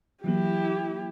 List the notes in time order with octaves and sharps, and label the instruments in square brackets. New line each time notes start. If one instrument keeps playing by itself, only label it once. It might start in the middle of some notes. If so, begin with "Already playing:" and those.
[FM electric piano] E3 F#3 A#3 [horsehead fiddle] E4 G4